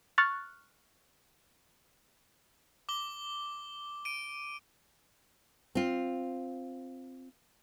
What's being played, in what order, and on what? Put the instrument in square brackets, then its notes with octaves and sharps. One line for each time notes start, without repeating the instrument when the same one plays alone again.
[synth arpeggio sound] C#6 F6 F#6 A6
[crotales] D6 G7
D7 D#7
[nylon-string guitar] C4 F4